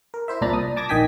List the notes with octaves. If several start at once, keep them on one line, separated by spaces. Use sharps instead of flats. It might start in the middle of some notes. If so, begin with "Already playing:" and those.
A#4
E4 C5 E5
C2 A#2 D4 A#5 B5 A6
D#6
A5 D6 G#6 A#6
A#1 D#3 D#5 G5 G#5 B6